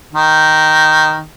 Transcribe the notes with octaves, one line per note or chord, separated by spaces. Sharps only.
D#3